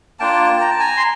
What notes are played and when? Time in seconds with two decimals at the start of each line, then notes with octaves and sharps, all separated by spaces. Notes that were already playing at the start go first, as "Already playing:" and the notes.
0.20 A#3 D4 F4 G5 A5
0.61 A#5
0.71 A5
0.80 G#5 A#5
0.97 C6